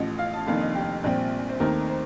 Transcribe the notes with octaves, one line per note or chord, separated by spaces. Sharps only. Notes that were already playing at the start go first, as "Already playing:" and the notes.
Already playing: A1 A2 F3 D#5
F5
A5
F1 F2 D#3 A#3 D4 F5
D#5
G4
A#1 A#2 G3 C4
C5
D#2 D#3 A3 C4 D#4 A#4
C5